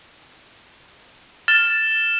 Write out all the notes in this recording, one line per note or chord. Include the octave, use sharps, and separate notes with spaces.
F6 A6 E7